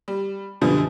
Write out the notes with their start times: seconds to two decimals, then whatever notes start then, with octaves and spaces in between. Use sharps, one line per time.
0.08 G3
0.61 F#2 B2 D3 F3 G3